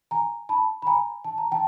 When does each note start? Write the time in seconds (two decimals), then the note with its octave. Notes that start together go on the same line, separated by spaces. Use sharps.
0.11 G#5 A#5
0.49 A5 B5
0.82 B5
0.87 G#5 A#5
1.24 A5
1.38 A#5
1.51 G5 A5